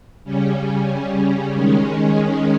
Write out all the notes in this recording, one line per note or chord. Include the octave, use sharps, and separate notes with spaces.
C#3 G3 C#4
D#3 G#3 C#4